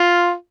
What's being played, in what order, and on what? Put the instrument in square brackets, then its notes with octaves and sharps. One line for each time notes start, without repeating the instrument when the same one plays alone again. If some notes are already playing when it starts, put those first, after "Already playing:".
Already playing: [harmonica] F4